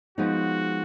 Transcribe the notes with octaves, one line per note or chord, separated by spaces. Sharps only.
F3 G#3 B3 D#4 F#4